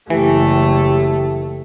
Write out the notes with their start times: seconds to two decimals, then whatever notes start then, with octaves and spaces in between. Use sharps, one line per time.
0.10 F#1 E3 A3 G4